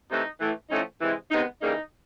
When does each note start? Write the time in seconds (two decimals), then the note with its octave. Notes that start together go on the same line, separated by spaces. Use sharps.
0.09 C3 E3 A3 D#4
0.40 A2 E3 A3
0.70 A2 F3 A3 C#4 D#4
1.01 C3 E3 G#3
1.31 C3 D#3 G#3 B3 D#4
1.61 C#3 E3 G3 A#3 D#4